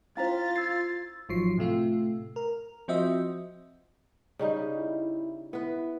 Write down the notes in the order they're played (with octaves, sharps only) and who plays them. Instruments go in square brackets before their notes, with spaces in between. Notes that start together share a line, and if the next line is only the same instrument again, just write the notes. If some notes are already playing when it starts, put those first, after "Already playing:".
[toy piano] C#4 E4 C5 [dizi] F4 [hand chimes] F5 A#5 B6 [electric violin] A6
[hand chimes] E6 G#6 C7
[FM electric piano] G#1 F3 F#3 C7
A2 C3 A3 F4
A#4
F3 C4 F#4 D#5 E5
[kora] C#3 G3 D#4
[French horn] E4
[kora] B3 B4 [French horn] E4